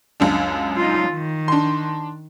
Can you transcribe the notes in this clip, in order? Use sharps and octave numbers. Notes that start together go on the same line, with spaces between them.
C#2 F#2 D4
D#4 F4
D#3
D4 C6